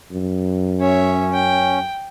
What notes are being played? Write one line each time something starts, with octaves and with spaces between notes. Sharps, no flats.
F#2
C#4 C#5 E5
G5